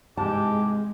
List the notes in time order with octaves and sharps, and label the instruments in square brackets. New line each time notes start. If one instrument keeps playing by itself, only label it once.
[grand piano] G#2 C3 E3 [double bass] G#3 [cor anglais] G4 [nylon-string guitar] A5